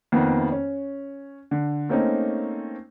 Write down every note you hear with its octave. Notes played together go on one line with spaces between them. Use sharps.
F2 D#3 A#3 B3
C#4
D3
A3 A#3 C4 C#4 D#4